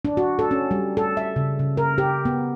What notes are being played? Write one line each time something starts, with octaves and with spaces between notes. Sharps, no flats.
D4
F#4
A4
C#4
G3
A4
E5
C#3
C#3
A#4
G4
B3